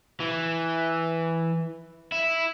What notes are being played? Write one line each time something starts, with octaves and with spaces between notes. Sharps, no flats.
E3
E4